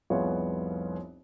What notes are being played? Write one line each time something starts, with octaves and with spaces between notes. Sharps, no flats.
F1 C2 B3 F4 G#4 C#5